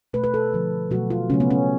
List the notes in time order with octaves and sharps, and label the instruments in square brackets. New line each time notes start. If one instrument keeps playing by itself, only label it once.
[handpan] B2 A3 B4
B4
A4
D3 F3 A3
B2 F#3 A3 F#4
F4
C#3 F#3 A3 C#4
B3
C#4